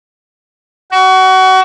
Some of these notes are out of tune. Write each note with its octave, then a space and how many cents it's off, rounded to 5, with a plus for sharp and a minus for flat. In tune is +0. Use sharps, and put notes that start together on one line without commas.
F#4 +25